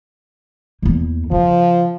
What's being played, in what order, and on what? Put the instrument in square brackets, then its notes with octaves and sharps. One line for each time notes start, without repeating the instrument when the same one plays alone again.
[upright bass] E2 A#3
[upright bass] C#3 [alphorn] F3